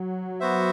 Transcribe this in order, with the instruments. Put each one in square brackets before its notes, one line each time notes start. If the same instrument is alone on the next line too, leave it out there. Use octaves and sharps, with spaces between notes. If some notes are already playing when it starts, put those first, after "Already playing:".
Already playing: [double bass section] F#3
[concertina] B3 F#4 C5 E5